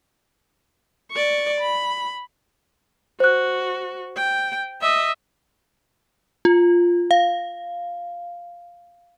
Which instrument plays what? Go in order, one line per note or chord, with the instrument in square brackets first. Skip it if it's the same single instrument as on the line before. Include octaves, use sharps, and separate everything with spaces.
[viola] D5 C#6
B5
[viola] F#4 [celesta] C5 F#6
[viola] G5
D#5 E5
[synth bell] F4
F5